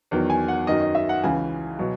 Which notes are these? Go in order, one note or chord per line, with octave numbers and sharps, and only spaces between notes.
E2 D#3 F#3
G#5
F#5
F#2 D#3 F#3 D#5
D#5
E5
F#5
C#2 C#3 E3 G#5
B2 F#3